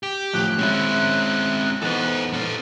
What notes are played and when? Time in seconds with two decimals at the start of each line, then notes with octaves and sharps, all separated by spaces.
0.03 G4
0.33 A2 F3 F#3 F#6
0.58 G#3 C4 C#4 E4
1.82 E3 B3 D#4 A4 C5
2.34 C#4 A4